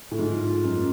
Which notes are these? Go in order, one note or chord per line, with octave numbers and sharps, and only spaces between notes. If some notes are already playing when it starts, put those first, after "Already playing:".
A2 E4
G#2 F4
F#2